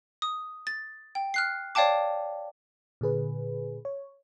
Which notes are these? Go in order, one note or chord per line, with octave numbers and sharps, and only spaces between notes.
D#6
A6
G5
F6 F#6 C7
C#5 D5 F5 G5 A5 D6
A#2 D3 G#4 B4
C#5